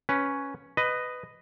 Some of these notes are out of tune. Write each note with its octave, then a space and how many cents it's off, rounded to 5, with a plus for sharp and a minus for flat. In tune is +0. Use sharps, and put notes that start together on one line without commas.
C#4 +0 B4 +0
B4 +15 D#5 -5